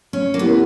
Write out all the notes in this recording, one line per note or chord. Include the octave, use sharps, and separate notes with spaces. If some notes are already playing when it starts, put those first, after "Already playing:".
C#4
A#3
B3 E4 G4 A#4